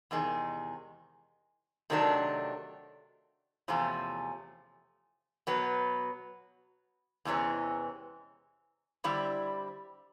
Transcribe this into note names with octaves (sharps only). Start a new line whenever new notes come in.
E2 C3 D#3 G#3
C3 D#3 F#3 A3 D4
E2 C3 F3 A3 C#4
B2 F#3 B3
E2 C3 E3 G#3 C#4
D3 G3 C4 E4